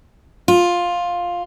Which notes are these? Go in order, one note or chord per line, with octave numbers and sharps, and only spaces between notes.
F4